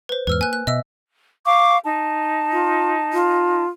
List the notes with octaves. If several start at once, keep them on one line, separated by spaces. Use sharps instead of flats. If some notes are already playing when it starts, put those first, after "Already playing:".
B4 C5
E2 G#2 B4 E6 F6
A#3 G#5 F#6
F#6
B2 D#5 E5 E6
F5 C#6 D6
D#4 A5
F4
F4